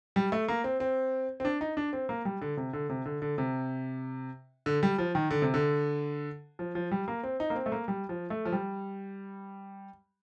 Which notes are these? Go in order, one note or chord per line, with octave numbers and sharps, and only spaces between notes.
G3
A3
A#3
C4
C4
C4
D4
D#4
D4
C4
A#3
G3
D3
C3
D3
C3
D3
D3
C3
D3
G3
F3
D#3
D3
C3
D3
F3
F3
G3
A#3
C4
D#4
A#3
C4
A3
A#3
G3
F3
A3
F3
G3